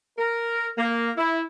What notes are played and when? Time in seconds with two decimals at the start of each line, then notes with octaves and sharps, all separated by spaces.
0.18 A#4
0.78 A#3
1.17 E4